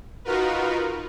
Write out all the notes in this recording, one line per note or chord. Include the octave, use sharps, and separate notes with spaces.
D#4 F4 F#4 A#4 B4